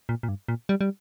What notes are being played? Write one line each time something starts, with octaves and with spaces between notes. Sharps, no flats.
A#2
A#2
G2
A#2
G3
G3